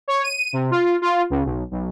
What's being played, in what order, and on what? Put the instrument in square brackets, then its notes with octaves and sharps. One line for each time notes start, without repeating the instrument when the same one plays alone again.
[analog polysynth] C#5
D#7
C3
F4
F4
C#2
B1
B1